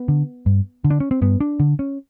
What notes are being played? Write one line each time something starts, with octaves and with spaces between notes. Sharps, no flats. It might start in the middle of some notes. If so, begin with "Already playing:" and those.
Already playing: B3
D3
G2
D3
D4
C#4
C4
G2 B3
D4
D3
C#4